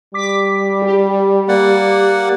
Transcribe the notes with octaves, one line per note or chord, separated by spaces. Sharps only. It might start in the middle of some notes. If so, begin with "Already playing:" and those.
G3 D6 B6
G4
A#3 D5 F#5